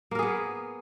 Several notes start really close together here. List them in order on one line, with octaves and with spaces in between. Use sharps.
A#3 A#4 G#4 B3